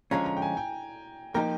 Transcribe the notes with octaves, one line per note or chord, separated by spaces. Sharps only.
D3 F3 G#3 C#4 F4 A#5
A#5
G5
G#5
G5
F3 A#3 D#4 G4 A#4 G5